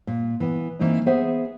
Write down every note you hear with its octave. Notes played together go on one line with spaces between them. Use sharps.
A#2
E3 B3
E3 A#3 C4 D#4 E4
B3 G#4 C5 E5 F#5